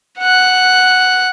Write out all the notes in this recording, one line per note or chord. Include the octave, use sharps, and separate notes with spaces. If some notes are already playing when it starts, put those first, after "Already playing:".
F#5 F#6